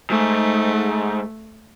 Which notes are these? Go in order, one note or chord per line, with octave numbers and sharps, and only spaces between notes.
G#2 A3